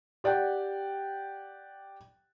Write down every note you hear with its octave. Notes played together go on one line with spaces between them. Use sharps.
G4 D5 F#5 G5